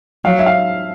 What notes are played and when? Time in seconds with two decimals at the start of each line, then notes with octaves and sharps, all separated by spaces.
0.25 F#3 F5
0.39 E5
0.46 F5